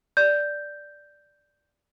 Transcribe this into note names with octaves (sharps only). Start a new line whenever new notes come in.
D5 G6